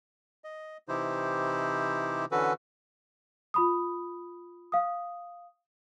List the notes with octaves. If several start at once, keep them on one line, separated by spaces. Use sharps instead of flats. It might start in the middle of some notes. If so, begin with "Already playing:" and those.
D#5
C3 E3 D#4 E4 G4 C5
D3 E3 C#4 F#4 A4 B4
F4 B5 D#6
F5 D#6